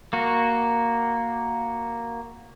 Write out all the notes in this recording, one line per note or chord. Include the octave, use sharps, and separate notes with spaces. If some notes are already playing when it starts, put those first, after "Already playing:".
A#3 F#4